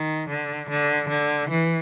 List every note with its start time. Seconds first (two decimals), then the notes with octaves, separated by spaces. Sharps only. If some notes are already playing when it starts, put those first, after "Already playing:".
Already playing: D#3
0.29 D3
0.70 D3
1.09 D3
1.50 E3